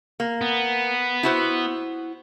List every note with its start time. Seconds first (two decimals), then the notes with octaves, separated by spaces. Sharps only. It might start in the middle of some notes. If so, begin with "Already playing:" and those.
0.20 A#3
0.41 B3
1.23 E4 F#4 C5